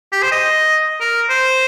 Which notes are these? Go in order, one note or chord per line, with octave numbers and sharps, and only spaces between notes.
G4
C5
D#5
A#4
C5